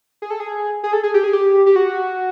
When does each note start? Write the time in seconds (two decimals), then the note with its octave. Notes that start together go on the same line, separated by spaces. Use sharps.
0.22 G#4
0.30 A4
0.40 G#4
0.84 G#4
0.93 A4
1.03 G#4
1.14 G4
1.24 G#4
1.33 G4
1.66 G4
1.76 F#4